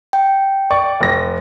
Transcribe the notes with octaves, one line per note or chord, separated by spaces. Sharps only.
G5
D5 C#6
F1 A#6